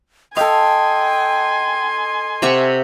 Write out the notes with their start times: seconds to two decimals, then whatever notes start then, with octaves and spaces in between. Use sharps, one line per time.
0.37 A4 D#5 F5 G5 G#5 C6
2.42 C3 E5 F#5 C#6 D6